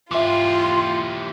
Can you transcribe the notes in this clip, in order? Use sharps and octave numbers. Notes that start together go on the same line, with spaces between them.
E3 F4 G4 E5 C6 D6